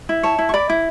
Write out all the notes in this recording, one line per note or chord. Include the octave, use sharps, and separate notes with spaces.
E4
C#5 A5 C#6
E4
C#6
D5 B5 D6
E4